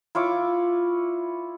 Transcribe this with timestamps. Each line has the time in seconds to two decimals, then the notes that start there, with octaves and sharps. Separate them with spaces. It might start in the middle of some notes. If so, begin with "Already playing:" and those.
0.15 E4 F4 C#5 D6